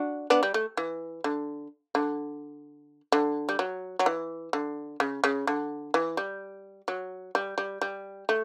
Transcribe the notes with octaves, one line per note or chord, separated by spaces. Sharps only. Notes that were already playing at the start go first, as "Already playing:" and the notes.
Already playing: D4 F#4
B3 D4
G3
A3
E3
D3
D3
D3
G3
F#3
F#3
E3
D3
C#3
C#3
D3
E3
G3
F#3
G3
G3
G3
A3